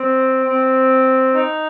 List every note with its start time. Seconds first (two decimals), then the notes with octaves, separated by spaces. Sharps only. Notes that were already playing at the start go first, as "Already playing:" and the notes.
Already playing: C4
0.46 C4
1.34 D#4